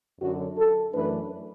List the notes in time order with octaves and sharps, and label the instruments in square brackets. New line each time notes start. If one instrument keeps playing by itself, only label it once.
[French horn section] F#2 D3 F#3 F#4
A4
F#2 E3 A3 D4 B4